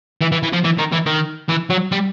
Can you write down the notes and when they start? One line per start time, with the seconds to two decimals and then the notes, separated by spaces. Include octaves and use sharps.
0.21 E3
0.32 E3
0.43 E3
0.53 F3
0.64 E3
0.78 D#3
0.92 E3
1.06 D#3
1.49 E3
1.70 F#3
1.92 G3